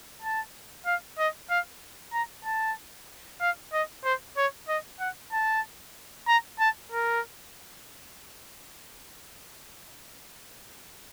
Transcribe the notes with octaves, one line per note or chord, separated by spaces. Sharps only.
A5
F5
D#5
F5
A#5
A5
F5
D#5
C5
C#5
D#5
F#5
A5
A#5
A5
A#4